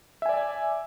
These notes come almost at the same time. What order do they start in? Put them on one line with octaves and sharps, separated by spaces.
E5 G#5 D5